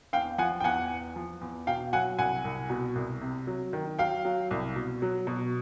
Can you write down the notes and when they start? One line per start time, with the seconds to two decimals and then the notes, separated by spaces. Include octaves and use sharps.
0.13 E2 F5 G5
0.38 F3 F#5 G#5
0.60 G5
0.64 E2 F#5 G#5
0.90 E2
1.16 F3
1.41 E2
1.67 B2 F5 G5
1.93 F#3 F#5 G#5
2.18 C2 F#5 G#5
2.44 C2
2.70 B2
2.95 C2
3.22 C3
3.47 F#3
3.73 D#3
3.99 F#3 F5 G5
4.25 F#3
4.51 C2
4.76 B2
5.02 F#3
5.27 B2